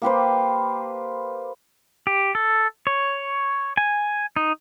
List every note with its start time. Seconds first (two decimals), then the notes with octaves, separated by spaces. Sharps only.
0.02 A#3 G4 B4 C5
2.07 G4
2.35 A4
2.87 C#5
3.77 G#5
4.36 D#4